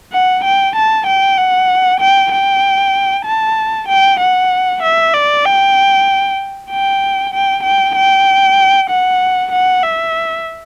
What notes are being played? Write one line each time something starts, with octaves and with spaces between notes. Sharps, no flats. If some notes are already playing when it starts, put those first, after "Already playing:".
F#5
G5
A5
G5
F#5
G5
G5
A5
G5
F#5
E5
D5
G5
G5
G5
G5
G5
F#5
F#5
E5